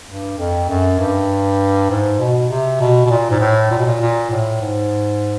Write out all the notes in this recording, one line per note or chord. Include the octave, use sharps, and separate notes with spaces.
G2
F2
F#2
G2
G#2
B2
C3
B2
B2
A#2
G#2
A2
A#2
B2
A#2
A#2
A2
G#2